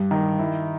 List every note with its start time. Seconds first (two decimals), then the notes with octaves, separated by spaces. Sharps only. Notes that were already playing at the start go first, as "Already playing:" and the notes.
Already playing: G2
0.11 D#3
0.39 E4